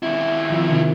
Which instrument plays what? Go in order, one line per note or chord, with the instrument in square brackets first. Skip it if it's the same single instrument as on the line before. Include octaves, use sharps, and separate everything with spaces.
[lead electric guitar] D#2 E4
[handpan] D#3 F3 E5
C3 D#3